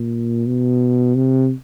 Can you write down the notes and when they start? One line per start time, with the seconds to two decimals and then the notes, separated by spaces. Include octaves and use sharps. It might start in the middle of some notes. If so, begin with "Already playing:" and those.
Already playing: A#2
0.47 B2
1.15 C3